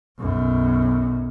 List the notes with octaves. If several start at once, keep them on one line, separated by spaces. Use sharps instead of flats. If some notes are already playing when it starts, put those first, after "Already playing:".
B1 F#2